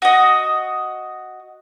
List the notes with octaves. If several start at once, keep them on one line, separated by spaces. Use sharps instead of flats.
F#4 D#5